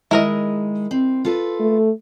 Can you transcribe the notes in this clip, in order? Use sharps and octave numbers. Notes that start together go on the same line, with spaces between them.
D#3 G#3 E4 A#4 D#5
C4
F4 A4 B4
A3